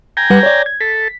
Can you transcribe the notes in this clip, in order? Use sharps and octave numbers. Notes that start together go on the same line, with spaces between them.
G5 G#5 A#5
G3 B4 F#5
C#5 D5
G#6
A4 B6